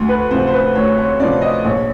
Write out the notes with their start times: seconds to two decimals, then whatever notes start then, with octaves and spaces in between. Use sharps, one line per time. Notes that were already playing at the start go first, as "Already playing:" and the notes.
Already playing: D2
0.09 B4
0.31 C3 C5
0.34 F3
0.47 C5
0.54 B4
0.75 D2 C#5
0.98 C#5
1.20 C3 F3 D5
1.42 D#5
1.64 A#1 C#5